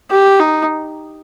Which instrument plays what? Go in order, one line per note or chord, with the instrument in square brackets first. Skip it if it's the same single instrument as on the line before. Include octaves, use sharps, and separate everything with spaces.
[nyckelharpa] G4
D#4